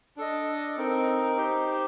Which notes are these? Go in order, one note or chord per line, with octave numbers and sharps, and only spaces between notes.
D4 A4 D#5
C4 D#4 A#4
D#4 G4 C5